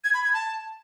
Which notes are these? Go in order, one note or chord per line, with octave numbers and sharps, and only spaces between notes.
G#6
B5
G#6
A5